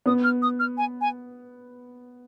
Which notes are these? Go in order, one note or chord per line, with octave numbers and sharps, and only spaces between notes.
B3 D#6
F6
D#6
F6
G#5
G#5